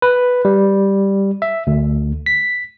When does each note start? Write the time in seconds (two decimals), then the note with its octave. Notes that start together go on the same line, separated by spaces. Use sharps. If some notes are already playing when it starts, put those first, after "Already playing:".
0.02 B4
0.45 G3
1.42 E5
1.67 D2
2.26 B6